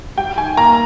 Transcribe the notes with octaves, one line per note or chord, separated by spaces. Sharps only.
G3 G5
D#3 G#5
A#3 A#5